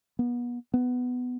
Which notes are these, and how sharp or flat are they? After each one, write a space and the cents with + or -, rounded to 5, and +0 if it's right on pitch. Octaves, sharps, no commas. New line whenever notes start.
B3 -30
B3 +10